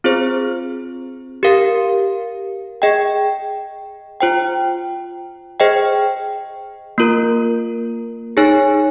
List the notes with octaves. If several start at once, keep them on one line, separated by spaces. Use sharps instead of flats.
C4 F4 G#4 C5
G4 A#4 F5
G#4 D#5 G5
F4 C5 G5
G#4 C5 D#5 G5
A#3 F4 A#4
D#4 G#4 C#5 G#5